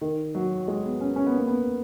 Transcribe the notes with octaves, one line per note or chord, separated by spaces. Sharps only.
D#3
F#3
G#3
B3
C#4
C#4
B3
A#3
B3